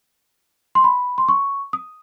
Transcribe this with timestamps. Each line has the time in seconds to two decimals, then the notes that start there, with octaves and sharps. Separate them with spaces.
0.75 C6
0.84 B5
1.18 C6
1.29 C#6
1.73 D#6